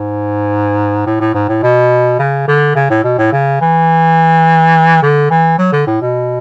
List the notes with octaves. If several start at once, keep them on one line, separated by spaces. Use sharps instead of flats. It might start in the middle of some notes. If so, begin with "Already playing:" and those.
Already playing: G#2
A2
A2
G#2
A2
B2
C#3
D3
C#3
A2
B2
A2
C#3
E3
D3
E3
F#3
D3
A2
B2